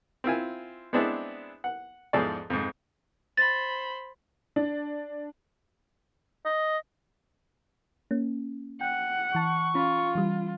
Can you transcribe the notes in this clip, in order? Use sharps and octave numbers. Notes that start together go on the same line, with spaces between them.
C4 E4 F4 G#5
G#3 B3 C4 D4 E4 G#4
F#5
E2 G#2 F3 G#4 A4 D5
F2 G#2
C5 B5 A6
D4
D#5
A#3 C#4
F#5 G5
E3 A5 C#6
C#4 F4 B5
E3 G3